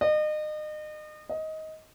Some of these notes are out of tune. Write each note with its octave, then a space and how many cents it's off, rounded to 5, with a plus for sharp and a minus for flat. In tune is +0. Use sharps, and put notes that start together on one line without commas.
D#5 -35
D#5 +15